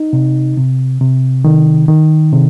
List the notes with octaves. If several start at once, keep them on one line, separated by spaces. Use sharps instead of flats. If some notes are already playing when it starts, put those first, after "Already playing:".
Already playing: D#4
C3
C3
C3
D#3
D#3
C3